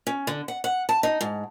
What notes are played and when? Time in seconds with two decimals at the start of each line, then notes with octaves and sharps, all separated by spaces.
0.07 C#4
0.27 D3
0.48 F#5
0.64 F#5
0.89 A5
1.03 D#4
1.21 G#2